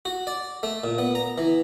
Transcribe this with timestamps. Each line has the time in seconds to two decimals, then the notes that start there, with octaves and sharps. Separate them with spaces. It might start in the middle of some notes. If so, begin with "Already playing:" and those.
0.05 F#4
0.27 D5
0.63 A3
0.84 A#2
0.98 B3
1.15 A#5
1.38 E3